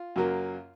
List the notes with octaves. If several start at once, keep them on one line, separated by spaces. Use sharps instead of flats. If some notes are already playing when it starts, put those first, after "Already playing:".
Already playing: F4
F#2 C#3 F#3 A#3